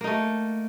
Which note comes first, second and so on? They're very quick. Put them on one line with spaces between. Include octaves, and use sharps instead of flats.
A#3 D#4 A3